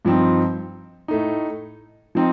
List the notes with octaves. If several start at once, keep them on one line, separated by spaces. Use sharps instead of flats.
G2 F3 C4 D#4
A2 A3 D#4
F3 C4 D#4